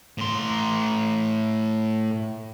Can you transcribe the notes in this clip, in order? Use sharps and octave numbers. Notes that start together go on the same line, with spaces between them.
A2 C6